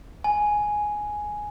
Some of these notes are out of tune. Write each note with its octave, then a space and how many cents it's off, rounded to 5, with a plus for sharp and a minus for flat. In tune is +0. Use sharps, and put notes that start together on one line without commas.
G#5 +5